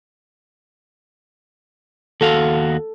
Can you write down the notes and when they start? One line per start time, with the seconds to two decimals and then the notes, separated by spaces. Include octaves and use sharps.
2.21 D#2 F#4 A4 F5